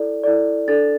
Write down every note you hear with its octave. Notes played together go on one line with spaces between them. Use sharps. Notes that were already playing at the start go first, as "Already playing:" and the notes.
Already playing: E4 A4 D5
E4 A4 D5
D4 A4 D5 A6